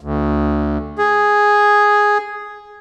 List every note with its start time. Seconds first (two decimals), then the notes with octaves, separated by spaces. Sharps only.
0.01 D2
0.98 G#4